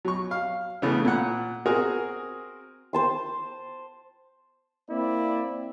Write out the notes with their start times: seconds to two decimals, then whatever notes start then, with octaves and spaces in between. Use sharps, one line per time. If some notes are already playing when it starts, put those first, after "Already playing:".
0.05 F#3 C#6
0.31 F5
0.82 C#3 E3 A3 B3
1.05 A#2 F#5
1.66 C4 F#4 G#4 A#4
2.93 C5 A5 C6
4.89 A#3 C4 E4 D5